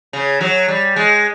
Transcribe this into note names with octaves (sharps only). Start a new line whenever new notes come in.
C#3
F#3
G3
G#3